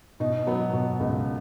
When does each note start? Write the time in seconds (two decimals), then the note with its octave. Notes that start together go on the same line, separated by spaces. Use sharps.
0.20 B2 D#4
0.47 F#3 B3
0.73 B2
1.00 C#2